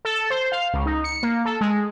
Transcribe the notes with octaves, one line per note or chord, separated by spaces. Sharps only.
A4
C5
F5
C#2
D#4
C#7
A#3
A4
G#3